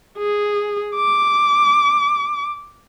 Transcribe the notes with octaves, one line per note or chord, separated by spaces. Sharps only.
G#4
D6